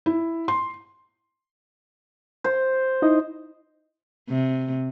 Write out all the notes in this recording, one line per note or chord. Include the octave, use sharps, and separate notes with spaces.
E4
C6
C5
D#4 E4 D#5
C3